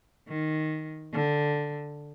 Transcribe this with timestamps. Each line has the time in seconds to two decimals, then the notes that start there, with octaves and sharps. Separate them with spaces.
0.28 D#3
1.13 D3